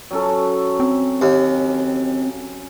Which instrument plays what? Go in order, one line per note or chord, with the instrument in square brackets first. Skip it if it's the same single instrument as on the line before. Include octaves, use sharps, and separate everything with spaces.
[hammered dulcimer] F#3 C#4 A4
[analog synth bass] C4
[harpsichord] D#2